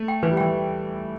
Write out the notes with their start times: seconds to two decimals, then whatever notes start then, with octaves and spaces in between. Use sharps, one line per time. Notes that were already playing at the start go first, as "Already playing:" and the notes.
Already playing: A3
0.08 G5
0.23 E3 B4
0.31 G3
0.37 E3 G5